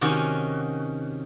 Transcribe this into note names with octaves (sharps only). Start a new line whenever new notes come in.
C3 D#3 C#4 F#4